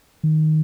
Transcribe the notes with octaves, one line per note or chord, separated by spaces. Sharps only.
D#3